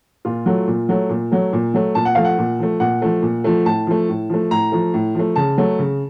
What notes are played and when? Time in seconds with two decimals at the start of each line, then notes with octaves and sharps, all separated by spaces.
0.25 A#2 F4
0.46 F#3 A3
0.68 A#2
0.89 F#3 A3
1.09 A#2
1.32 F#3 A3
1.53 A#2
1.74 F#3 A3
1.95 A#2 A5
2.05 F#5
2.15 F3 A3 F5
2.25 F#5
2.38 A#2
2.59 F3 A3
2.80 A#2 F#5
3.02 F3 A3
3.23 A#2
3.44 F3 A3
3.65 A2 A5
3.87 F3 A3
4.09 A2
4.30 F3 A3
4.51 A2 A#5
4.72 F3 A3
4.94 A2
5.15 F3 A3
5.36 C#3 A5
5.58 F#3 A3
5.79 C#3